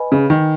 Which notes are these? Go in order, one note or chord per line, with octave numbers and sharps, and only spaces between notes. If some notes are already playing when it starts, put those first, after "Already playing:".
Already playing: B4 D#5 G#5 B5
C#3
D#3